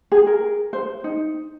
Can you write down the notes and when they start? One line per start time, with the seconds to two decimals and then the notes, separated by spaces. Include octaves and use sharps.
0.12 G#4
0.27 A#4
0.73 C5
1.04 D#4